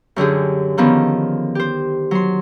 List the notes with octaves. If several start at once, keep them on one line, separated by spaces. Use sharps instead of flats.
F#2 D3 G4 G#4
D3 D#3 F3 B3 C#4
G4 C5
F#3 C6